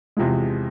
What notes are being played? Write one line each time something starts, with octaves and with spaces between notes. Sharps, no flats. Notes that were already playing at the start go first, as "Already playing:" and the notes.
E2 C3 F3 G#3